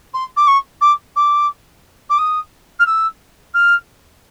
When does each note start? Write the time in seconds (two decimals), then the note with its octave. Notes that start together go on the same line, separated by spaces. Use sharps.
0.13 C6
0.36 D6
0.47 C#6
0.81 D6
1.16 D6
2.09 D6
2.18 D#6
2.79 F6
2.86 E6
3.54 F6